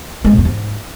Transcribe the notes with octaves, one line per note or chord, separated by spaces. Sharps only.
G#3
A#2
E2
G#2